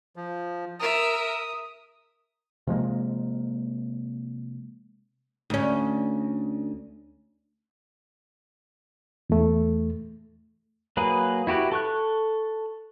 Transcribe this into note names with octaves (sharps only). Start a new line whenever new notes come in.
F3
A#4 E5 D#6
C3 F3 G#3 A#3
D2 C#4
E2 A3
F#3 A#3 G#4 B4
E4 F#4 G4 B4
A4 C#6 F#6